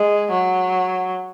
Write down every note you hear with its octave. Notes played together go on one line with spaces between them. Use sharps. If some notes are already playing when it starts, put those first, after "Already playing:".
Already playing: G#3
F#3